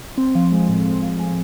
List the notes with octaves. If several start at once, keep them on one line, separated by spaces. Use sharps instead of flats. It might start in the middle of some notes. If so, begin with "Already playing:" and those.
C4
F3
G#3
A2
C4
F3
G#3